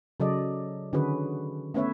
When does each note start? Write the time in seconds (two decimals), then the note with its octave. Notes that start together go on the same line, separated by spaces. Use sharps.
0.20 C#3 F#3 A4 D5 D#5
0.93 D3 D#3 C#4 F#4 G#4 B4
1.74 A3 B3 C#4 B4 C#5 E5